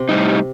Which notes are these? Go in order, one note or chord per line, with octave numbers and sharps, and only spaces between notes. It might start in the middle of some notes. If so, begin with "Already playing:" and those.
Already playing: C3
A2 G3 D#4